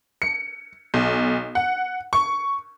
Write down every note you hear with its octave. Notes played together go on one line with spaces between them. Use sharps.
C#7
B1
F#5
C#6